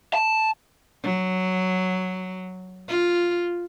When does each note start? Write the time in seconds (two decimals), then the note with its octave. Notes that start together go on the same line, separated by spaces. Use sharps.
0.13 A5
1.03 F#3
2.88 F4